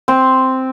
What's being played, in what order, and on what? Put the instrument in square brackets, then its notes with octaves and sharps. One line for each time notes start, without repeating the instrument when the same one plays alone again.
[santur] C4